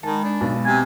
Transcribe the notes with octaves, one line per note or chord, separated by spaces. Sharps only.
D#3 G#3 A5 B5
D4
B1 B2
C3 G#5